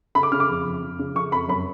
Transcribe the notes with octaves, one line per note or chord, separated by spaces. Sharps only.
C#3 B5
D6
C#3 F6
D6
F2
F2
F3
C#3
F3 C#6
F2 B5
F#2 B5